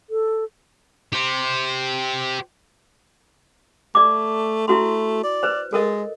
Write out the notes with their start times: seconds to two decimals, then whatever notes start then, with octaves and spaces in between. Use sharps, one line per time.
0.10 A4
1.13 G4 C5
3.95 A3 D5 D6
4.68 A3 E4 F#4 C6
5.24 D5
5.43 B4 C5
5.73 G#3 A4 A#4 D#5